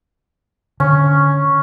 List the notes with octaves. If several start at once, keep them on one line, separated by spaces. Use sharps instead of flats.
D3 C#4